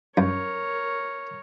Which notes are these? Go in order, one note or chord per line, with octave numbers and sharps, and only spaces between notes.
F#2 A#4 C#5